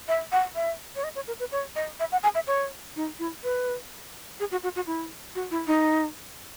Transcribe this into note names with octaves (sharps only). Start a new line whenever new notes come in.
E5
F#5
E5
C#5
D#5
C#5
A#4
B4
C#5
D#5
E5
F#5
G#5
E5
C#5
D#4
E4
B4
G#4
F#4
F#4
F#4
E4
F#4
E4
D#4